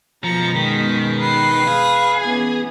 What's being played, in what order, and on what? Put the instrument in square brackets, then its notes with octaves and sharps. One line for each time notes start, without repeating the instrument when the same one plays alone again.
[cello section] F#2 B2 G#3 [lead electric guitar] F3 [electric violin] A#5 C#7
[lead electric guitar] D#3 [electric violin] B6
[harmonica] B4 [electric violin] C7
[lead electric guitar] G#4 [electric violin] F5
[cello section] E3 B3 C#4 [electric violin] G#5